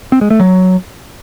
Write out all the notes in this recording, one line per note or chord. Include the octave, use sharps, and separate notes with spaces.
C4
G#3
A3
F#3